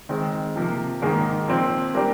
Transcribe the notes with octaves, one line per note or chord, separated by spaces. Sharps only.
D#3 G#3 C4
C3 F3 A#3
G#2 D#3 A#3 D#4 G#4
A#2 F3 C4
G3 A#3 D4 G4 A#4